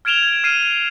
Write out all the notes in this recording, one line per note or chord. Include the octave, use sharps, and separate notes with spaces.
F6 G#6 D7 E7 F7 G7
G#6
F6 C7 D#7
D#7